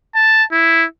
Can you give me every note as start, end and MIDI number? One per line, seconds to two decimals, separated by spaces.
0.15 0.44 81
0.52 0.85 64